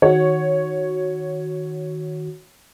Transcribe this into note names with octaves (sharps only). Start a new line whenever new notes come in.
D#3 F#4 C#5